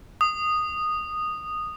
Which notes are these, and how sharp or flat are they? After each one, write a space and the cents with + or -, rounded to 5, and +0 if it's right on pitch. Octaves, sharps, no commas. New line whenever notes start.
D#6 -10